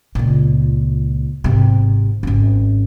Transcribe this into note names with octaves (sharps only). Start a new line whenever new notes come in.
C#2 A#2
G#1 C3
G#1 C#4